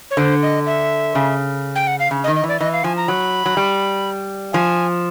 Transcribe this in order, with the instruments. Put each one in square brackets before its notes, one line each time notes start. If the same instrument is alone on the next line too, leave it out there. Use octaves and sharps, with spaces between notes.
[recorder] C#5
[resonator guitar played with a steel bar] D3 [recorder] C5
[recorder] D#5
E5
[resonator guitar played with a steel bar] C#3
[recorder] G5
F#5
F5
[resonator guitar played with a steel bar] C#3
[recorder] D#5
[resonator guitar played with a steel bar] D#3
[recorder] D#5
[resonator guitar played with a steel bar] E3 [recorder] D5
[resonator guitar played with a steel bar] E3 [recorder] D#5
[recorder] F5
[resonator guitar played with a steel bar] F3 [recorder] G#5
[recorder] A#5
[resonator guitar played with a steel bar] F#3 [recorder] B5
[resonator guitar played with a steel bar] F#3
G3
[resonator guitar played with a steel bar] F3 [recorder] G#5